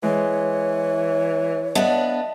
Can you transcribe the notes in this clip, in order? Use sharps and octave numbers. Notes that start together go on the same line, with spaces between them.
E3 G#3 C#5
B3 D4 D#5 E5 A5